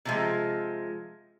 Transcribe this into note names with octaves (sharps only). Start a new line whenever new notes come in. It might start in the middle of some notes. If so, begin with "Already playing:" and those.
C3 F3 G#3